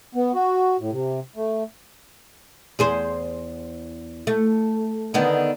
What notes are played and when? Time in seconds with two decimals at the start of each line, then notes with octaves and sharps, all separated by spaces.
0.15 B3
0.35 F#4
0.80 A2
0.91 C3
1.36 A3
2.79 E2 G#4 C5
4.27 A3
5.14 D3 D#3 B3